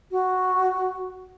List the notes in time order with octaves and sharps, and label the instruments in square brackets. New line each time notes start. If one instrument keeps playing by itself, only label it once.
[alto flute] F#4